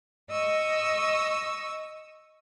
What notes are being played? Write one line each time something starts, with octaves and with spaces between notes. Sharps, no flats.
D#5 C#6 D#6 E6